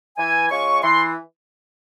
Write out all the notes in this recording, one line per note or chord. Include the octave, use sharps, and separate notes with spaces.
E3 G#5
G#3 C#4 F4 C#6
E3 C6